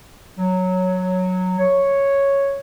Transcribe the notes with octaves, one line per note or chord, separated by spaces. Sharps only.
F#3
C#5